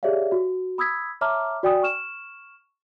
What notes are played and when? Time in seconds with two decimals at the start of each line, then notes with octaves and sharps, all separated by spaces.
0.03 G4 G#4 C#5 D5 E5 F5
0.32 F#4
0.78 B5 D#6 E6 G#6 B6
1.21 C#5 E5 A5 A#5 D6 F6
1.63 F#4 D5 G5 G#5 D#6
1.83 C#6 F6 E7